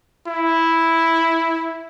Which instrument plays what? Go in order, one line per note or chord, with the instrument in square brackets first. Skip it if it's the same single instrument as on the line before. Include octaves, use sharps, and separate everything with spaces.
[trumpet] E4